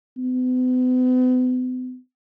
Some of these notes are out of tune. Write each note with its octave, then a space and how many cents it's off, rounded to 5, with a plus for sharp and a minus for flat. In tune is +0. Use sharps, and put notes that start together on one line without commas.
B3 +40